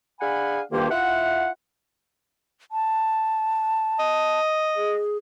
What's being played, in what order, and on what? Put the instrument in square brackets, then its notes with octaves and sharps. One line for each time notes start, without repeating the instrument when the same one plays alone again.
[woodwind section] D4 G#4 F5 F#5 G#5 B5
D2 G2 D#3 A#3 F4 G4
E4 F4 E5 F#5
[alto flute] A5
[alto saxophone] D#5
[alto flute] G#4